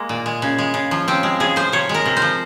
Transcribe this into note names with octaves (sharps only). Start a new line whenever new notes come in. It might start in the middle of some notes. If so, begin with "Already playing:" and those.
Already playing: G#3 A#3
A#2
G#3
C#3
G#3
C#3
F3
C#3 C4
G#3
C#3 G#4
F3 C5
C3 C#5
G#3
A#4
C3
C5
F3